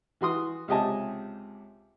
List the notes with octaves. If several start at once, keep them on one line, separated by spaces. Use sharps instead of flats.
E3 F#4 C6 D#6
C#2 C3 G4 D#5 G#5 A5